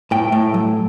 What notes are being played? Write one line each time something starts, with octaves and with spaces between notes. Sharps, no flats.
A2 G5
A2
F#3